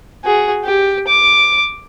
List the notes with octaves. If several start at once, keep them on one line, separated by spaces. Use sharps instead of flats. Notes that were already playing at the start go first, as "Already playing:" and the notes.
F#4 G#4
G4
D6